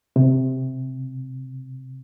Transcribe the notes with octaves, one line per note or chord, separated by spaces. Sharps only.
C3